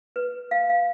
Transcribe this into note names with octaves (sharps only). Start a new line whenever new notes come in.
B4
F5
F5